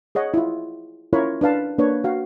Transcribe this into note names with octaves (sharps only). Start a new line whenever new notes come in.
G#4 C#5 D#5 F#5
E4 F4
C#4 E4 F4 A#4 C#5 B5
D4 B4 F5 A5
A#3 D4 B4 C#5
F#4 F5